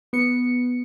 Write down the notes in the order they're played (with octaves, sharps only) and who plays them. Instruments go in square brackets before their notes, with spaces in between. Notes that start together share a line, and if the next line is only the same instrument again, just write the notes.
[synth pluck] B3 C#7